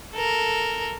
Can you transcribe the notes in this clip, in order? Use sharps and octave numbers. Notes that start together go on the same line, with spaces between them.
A4 A#4